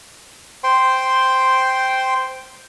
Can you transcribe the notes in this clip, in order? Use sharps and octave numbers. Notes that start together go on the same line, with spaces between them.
C5 G5 C6